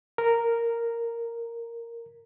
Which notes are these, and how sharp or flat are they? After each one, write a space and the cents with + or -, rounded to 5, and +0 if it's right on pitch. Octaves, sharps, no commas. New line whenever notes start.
A#4 -5